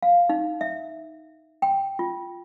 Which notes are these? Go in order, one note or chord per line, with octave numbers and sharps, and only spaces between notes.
F5
D#4
E5
G5
F4